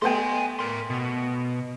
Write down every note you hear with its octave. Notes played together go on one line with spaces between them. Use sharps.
A3 B3 G5 G#5 C6
A#4 C6
B2